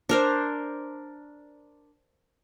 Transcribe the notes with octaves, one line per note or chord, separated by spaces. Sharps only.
D4 A#4 C5